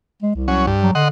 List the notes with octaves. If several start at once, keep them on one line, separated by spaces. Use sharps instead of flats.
G#3
C2
F#3 C#4
G2
F#3
D3 D#5 F#5 C6